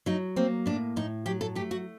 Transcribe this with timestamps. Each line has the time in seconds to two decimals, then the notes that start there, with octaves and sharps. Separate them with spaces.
0.06 F#3 D#4
0.36 A#3 C4
0.66 A2 D4
0.96 A2 D#4
1.26 F#3 G4
1.41 A4
1.55 A3 G4
1.71 F#4